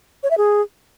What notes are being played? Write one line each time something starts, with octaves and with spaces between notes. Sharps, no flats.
C#5
E5
G#4